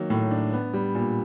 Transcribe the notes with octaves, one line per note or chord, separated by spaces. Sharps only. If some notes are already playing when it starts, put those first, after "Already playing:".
Already playing: D#3 F#3 A#3
A2
D4
B3
G3
A#2